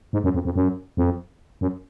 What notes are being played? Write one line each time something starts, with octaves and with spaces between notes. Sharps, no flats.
G#2
F#2
F2
F2
F#2
F2
F#2